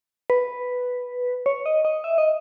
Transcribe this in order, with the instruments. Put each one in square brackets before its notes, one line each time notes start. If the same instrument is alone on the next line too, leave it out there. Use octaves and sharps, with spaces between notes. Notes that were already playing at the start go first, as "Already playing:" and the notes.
[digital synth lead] B4
C#5
D#5
D#5
E5
D#5